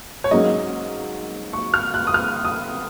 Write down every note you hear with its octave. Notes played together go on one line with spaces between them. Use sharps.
C#5
G#2 F#3 A#3 C#4 D#5
C#6
F6
F#6
D#6
F6
D#6